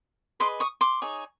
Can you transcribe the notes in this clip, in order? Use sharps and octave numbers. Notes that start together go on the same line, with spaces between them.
G#4 B4 D#5 C6 D6
C#6 D#6
C6 D6
D#4 G#4 C#5